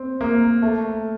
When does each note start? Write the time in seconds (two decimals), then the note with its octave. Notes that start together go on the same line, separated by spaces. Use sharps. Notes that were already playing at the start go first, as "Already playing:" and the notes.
Already playing: C4
0.21 A#3
0.62 A3